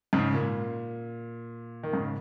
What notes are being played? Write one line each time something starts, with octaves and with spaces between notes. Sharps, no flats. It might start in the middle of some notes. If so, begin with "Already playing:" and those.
G#2 C#3
A#2
D#3
G#2 C#3